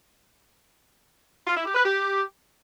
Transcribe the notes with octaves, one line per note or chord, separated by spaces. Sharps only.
F4
E4
G4
B4
G4